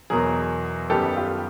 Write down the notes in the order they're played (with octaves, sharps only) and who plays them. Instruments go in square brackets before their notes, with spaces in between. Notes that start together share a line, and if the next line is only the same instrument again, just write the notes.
[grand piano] E2 B2 F#3 G#4 A#4
F#2 D#3 G3 B3 G4 A4
F4 G4